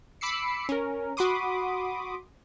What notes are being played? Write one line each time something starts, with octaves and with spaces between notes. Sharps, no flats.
B5 D6 E6 C7 C#7
C#4 A#4
F#4 B5 C6 D6 D#6